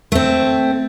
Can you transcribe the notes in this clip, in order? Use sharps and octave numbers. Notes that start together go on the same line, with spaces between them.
A3 C4